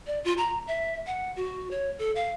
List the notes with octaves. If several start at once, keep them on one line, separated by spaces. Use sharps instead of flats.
D5
F4
A#5
E5
F#5
F#4
C#5
A4
F5